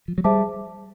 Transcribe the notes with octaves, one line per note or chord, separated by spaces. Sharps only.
F3
F#3
G3 G#4 C5 E5 A5 D6